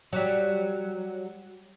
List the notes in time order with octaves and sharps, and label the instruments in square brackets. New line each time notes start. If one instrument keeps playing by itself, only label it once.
[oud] F#3 G3